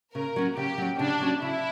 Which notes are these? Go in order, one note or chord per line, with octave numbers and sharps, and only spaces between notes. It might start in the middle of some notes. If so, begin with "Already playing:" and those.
C#3 A#4
F#3 C#4
C#3 G4
F#3 C#4
C#3 D4
F#3 C#4
C#3 E4